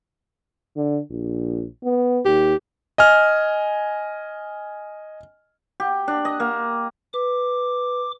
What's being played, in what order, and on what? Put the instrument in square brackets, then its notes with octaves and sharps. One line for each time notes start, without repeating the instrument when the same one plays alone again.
[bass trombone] D3
A#1
B3
[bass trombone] D#2 [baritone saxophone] G4
[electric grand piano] D#5 G#5 F6
[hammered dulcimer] G4
D4
D#5
A#3
[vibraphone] B4 [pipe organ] D6